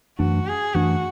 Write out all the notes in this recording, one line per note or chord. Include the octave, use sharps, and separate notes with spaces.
F#2 E3 A3 D4 F#4
G#4
F#2 E3 A3 D4 F#4